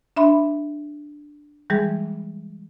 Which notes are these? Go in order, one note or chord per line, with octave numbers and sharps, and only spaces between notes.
D4 E5 B5 C6
E3 G3 G#3 G#4